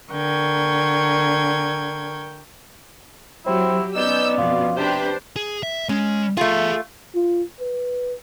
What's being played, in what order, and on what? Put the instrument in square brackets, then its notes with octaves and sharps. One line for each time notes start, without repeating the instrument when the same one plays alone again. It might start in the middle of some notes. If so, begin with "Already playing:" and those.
[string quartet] D3 A#4 G5 C#6 G#6
[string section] F#3 [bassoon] C4 [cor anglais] E4 [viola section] G4
[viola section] B3 C#4 [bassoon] D#4 [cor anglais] D5 [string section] E6 G6
[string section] F2 B2 [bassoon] F4
[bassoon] C3 [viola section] D4 C5 [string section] G4 B4
[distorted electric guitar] G#4
E5
[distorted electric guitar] G#3 [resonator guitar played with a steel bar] C#4
[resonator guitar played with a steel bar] A3 F4 [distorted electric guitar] G#4 E5
[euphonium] F4
B4